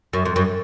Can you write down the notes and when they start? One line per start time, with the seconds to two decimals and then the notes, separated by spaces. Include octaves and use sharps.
0.13 F#2
0.25 F2
0.36 F#2